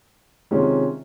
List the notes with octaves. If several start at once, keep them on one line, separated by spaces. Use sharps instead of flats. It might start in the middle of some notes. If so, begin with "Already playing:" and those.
C3 D#3 G#3 C#4 F4